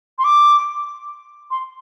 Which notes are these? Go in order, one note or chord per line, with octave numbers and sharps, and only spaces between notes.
C6
D6
C6